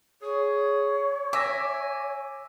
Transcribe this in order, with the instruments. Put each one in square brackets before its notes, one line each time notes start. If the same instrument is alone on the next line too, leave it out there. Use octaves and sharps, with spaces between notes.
[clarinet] G#4 [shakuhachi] C#5
[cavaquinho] E5 [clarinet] G#5 [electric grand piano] D6 E6 A#6